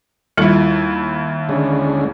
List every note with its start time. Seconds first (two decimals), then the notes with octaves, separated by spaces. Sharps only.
0.37 D#2 G3 E4 F4 A4
1.49 D3 G#3 C#4